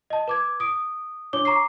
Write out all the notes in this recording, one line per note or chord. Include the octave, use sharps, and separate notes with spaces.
D#5 A5
B4 D6 G#6
D#6 D7
D4 C#5 D6 G7
A#5 C#6 D6 C7